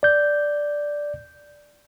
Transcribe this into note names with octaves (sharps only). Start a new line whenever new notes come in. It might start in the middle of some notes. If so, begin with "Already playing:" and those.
D5 G6